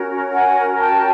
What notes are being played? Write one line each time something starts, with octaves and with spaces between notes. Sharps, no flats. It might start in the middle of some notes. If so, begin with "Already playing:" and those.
Already playing: C#4 F#4 A#4
F#5 G#5
G5 A5